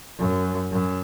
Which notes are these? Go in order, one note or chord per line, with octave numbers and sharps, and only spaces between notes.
F#2
F#2